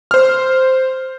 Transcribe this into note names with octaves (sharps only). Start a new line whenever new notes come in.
C5 F6